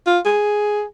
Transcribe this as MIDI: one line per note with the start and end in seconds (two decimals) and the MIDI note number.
0.06 0.19 65
0.25 0.83 68